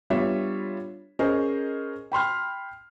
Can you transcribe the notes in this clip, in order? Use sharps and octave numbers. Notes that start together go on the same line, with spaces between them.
G3 B3 D4 F4 C#5 E5
C#4 G#4 A#4 C5 D#5
G5 B5 C6 F6